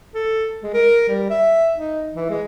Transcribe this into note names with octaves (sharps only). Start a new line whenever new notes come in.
A4
G#3
A#4
G3
E5
D#4
E3
G#3